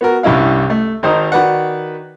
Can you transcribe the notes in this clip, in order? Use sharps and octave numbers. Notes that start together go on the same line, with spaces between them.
B3 F#4 A#4
C2 G2 C#4 E4 F5
A3
G#1 D#3 D#4 C5 D#6
D#3 F#4 B4 D5 F#5